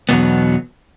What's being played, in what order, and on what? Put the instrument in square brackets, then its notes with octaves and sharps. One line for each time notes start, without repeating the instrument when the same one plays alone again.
[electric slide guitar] E2 B2 F#3 B3